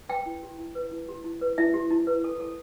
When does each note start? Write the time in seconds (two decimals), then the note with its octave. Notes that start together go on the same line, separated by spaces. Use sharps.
0.09 B4 G5
0.26 E4
0.43 G4
0.58 E4
0.75 B4
0.91 E4
1.09 G4
1.24 E4
1.41 B4
1.58 E4 E5
1.74 G4
1.90 E4
2.07 B4
2.24 A4
2.40 A4